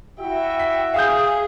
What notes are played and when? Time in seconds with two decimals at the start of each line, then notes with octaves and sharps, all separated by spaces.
0.19 E4 F#4 E5 G5
0.59 B6
0.94 G#4 F5 D#6 G6